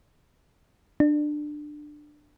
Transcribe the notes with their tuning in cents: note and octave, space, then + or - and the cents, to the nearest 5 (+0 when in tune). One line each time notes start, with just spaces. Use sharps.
D4 +20